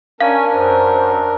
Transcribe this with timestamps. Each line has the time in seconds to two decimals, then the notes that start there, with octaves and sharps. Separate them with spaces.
0.21 C#4 D4 A#4 F5 G#5
0.53 F#2 C5